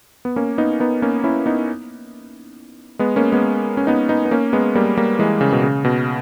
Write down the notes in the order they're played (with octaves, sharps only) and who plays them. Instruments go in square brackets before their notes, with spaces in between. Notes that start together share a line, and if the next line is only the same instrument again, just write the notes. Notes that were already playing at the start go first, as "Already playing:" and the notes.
[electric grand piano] B3
A#3 C#4
B3 D#4
B3 D#4
A#3 C#4
C#4 E4
B3 D#4
G#3 B3
A#3 C#4
G#3 B3
C#4
B3 D#4
B3 D#4
B3
A#3 C#4
G#3 B3
G3 A#3
G3 A#3
E3 G#3
C#3
B2
C#3
B2